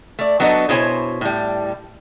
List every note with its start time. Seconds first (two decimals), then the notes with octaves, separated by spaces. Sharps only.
0.19 A3 D5
0.40 F#3 B3 D4 F#4 A4 D#5
0.69 B2 E4 C5 C#5 G#5
1.21 A2 G3